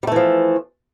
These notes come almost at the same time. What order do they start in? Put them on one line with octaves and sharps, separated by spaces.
G3 A3 E3 F3